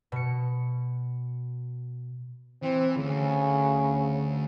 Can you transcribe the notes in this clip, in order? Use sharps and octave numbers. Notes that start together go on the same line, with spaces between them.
B2 C#7
E3 C4
D2 C#3